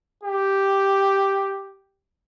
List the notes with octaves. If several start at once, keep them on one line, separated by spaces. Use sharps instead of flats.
G4